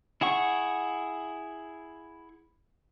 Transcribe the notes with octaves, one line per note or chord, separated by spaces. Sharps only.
E4 G#4 F#5 C#6